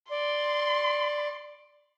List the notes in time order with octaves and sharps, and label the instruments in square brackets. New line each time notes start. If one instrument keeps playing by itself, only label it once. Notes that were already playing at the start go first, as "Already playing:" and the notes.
[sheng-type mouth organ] D5 [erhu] C6